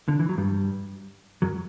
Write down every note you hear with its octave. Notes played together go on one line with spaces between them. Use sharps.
D3
E3
F#3
G2 G3
F#2 F#3